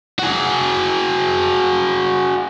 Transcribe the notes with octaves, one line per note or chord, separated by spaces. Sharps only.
F#4 G#4